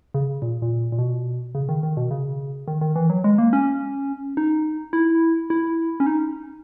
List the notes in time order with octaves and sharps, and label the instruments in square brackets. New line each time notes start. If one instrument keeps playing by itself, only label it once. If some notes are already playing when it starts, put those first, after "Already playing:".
[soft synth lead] C#3
A#2
A#2
A#2
B2
C#3
D#3
D#3
B2
C#3
D#3
D#3
E3
F#3
G#3
A#3
C#4
D#4
E4
E4
C#4
D#4